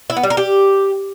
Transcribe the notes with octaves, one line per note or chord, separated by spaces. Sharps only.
E4
B3
G3
A#4
G4